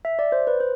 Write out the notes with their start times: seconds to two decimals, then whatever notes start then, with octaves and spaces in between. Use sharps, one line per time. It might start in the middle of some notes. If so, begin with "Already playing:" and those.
0.05 E5
0.19 D5
0.32 C5
0.47 B4
0.60 C5